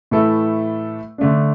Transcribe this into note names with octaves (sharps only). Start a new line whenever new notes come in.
A2 E3 A3 E4 A4
D3 A3 D4